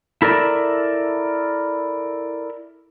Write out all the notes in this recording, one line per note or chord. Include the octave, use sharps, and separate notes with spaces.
E4 A4 A#4 D5 E5